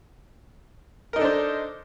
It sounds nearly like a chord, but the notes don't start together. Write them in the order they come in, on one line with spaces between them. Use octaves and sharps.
A#4 D#4 A4 D4 C5